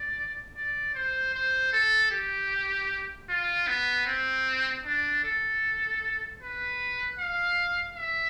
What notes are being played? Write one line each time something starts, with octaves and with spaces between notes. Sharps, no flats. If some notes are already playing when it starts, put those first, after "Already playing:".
Already playing: D5
D5
C5
C5
A4
G4
F4
B3
C4
D4
A4
B4
F5
E5